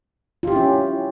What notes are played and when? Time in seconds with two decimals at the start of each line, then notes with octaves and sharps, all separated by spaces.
0.43 F4
0.47 G4
0.52 E4
0.56 C#4